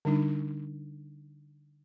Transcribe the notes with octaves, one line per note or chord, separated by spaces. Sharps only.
D3 G3 D4 D#4